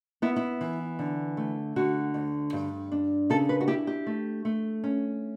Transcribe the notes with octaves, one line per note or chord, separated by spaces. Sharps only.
B3 E4
E4
E3
D3
A3
D3 F#4
D2
G2
D4
C#3 A4
B4
F#4
E4 G4
G4
A3
A3
C#4